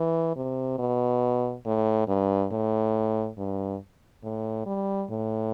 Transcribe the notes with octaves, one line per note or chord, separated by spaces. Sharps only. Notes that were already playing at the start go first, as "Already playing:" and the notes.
Already playing: E3
C3
B2
A2
G2
A2
G2
A2
G3
A2